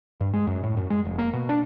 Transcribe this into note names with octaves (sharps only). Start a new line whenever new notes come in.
G2
G#3
F#2
A2
F#2
G#3
F1
A#3
B2
D4